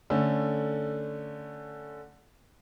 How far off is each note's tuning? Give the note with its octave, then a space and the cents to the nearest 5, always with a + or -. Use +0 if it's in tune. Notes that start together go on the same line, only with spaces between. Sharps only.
D3 +0 A3 +5 C#4 +0